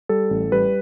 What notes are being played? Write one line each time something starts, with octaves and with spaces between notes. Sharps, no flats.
G3 A4
A1
G3 B4